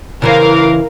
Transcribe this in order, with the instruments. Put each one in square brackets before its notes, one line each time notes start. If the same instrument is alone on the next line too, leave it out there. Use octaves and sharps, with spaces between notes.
[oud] C#3 E3 C5 [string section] A#4 F5